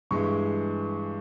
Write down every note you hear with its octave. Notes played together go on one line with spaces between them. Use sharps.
G2 E3 G#3 C#6